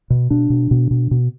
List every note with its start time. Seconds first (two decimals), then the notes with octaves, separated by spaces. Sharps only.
0.10 B2
0.30 B2 D4
0.50 B2
0.71 B2
0.91 B2
1.11 B2